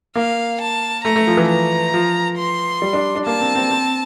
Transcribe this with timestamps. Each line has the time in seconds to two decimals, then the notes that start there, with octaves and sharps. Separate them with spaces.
0.16 A#3 F5
0.61 A5
1.04 A3 A#5
1.16 A3
1.27 F3
1.37 E3
1.49 A#5
1.94 F3
2.38 C6
2.82 G3
2.93 D4
3.16 D4
3.26 A#3 A5
3.41 C4
3.55 C4
3.71 C4